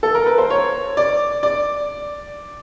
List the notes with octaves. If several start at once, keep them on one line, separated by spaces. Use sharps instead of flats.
A4
A#4
B4
C5
C#5
D5
D5